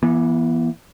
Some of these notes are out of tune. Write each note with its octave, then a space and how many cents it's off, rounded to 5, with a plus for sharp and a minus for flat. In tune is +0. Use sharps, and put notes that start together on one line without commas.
E3 +20 B3 -30